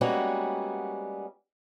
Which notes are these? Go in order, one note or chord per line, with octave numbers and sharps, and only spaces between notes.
G3 G#3 A#3 B3 C#4 F#4